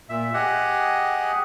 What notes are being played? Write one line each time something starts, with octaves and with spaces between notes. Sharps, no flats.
A#2 E5
G4 G#4 D#5 F#5